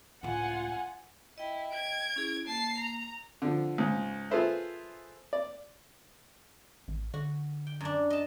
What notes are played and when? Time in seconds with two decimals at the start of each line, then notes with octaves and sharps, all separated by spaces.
0.23 C#2 A2 F4 F#5 G#5
1.38 E4 D#5 G5
1.72 G#6 D7
2.16 C#4 E4 G#4
2.47 A#3 A5 C7
2.78 A#5
3.42 D3 F3
3.78 C#2 G#2
4.31 F4 G#4 A4 B4 C5 E5
5.33 D5
6.88 A1
7.14 D3 F#4
7.67 G5
7.81 F#2 D4
8.10 D#5 A5